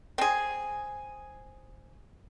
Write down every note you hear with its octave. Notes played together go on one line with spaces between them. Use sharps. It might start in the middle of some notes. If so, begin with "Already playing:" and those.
C4 G#4